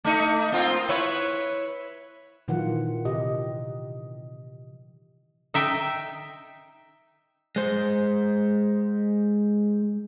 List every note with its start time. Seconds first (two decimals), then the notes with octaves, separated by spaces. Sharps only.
0.04 A3 D#4
0.52 A#3 C4 F4
0.89 E4 B4 C#5
2.48 A#2 D#3 E3 F#3 F4 F#5
3.05 C3 G4 D#5
5.54 D#4 E5 G5
7.56 G#3 C5